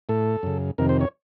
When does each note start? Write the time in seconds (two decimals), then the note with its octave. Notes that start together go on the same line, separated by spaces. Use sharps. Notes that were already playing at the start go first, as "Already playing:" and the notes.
0.09 A2 A4
0.43 F#2 C#3
0.78 F2 C3 D#3 A#4
0.89 C5
1.01 C#5